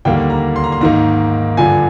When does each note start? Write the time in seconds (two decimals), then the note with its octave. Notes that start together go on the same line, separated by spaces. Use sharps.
0.05 D#2 D3 G3 A#3 G5
0.30 A#5
0.56 C6
0.64 A#5
0.72 C6
0.81 G#2 D#3 A#3 A#5
1.57 G2 D3 F3 G#5